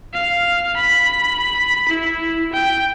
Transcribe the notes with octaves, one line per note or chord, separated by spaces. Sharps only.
F5
B5
E4
G5